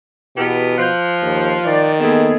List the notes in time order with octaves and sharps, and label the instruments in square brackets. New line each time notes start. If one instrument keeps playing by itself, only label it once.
[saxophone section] E2 B3 G4 [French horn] B2
[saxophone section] F3 [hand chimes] F#6 G6
[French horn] D#2
[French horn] D#3 [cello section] D5
[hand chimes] A#3 A4 D#5 [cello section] B3 G#4